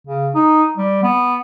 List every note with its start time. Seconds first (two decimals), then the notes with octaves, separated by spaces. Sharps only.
0.07 C#3
0.35 D#4
0.77 G3
1.03 B3